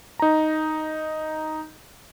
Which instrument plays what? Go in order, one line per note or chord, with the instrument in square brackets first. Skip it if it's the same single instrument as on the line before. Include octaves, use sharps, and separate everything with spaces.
[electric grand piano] D#4 A#5